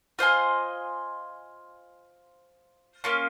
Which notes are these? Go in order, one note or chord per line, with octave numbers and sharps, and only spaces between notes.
F4 C5 D#5 G#5
A#3 C#4 F4